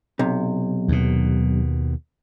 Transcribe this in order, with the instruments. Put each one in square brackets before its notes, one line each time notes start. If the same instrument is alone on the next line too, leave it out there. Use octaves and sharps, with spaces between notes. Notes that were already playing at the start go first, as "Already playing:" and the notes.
[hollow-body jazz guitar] B1 C3
[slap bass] D#2 B2